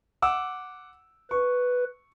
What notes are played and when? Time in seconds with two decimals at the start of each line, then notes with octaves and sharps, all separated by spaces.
0.22 F#5 D6 E6
1.31 B4 C#6